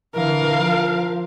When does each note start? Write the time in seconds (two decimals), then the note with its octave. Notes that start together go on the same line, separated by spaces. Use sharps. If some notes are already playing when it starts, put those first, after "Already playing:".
0.14 D3 E3 A#4 F5
0.57 F3